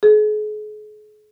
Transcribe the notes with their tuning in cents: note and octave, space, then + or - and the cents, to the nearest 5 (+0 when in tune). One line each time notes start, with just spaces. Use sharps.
G#4 +40